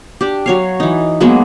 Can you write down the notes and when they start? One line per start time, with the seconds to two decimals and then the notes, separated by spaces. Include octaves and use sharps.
0.21 D4 G4
0.46 F#3 C#5 F5
0.80 E3 D#4
1.20 F#3 G#3 A#3 B3